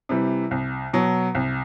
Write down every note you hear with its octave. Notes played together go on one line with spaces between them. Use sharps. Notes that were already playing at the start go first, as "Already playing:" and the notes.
C3 E3 G3
C2
B2 F#3
C2